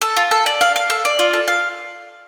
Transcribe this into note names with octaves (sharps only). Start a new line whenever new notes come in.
A4
F4
A4
D5
F5
F5
A4
D5
F4
A4
F5